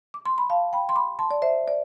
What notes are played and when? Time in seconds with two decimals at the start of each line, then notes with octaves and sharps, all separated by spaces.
0.14 D6
0.26 C6
0.38 B5
0.50 F5 A5
0.73 G5 B5
0.89 C6
0.96 B5 D6
1.19 A5 C6
1.31 D5
1.42 C5 E5
1.68 D5